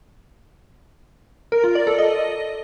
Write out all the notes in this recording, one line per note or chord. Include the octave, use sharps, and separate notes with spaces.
A#4
F4
D5
A4
D#5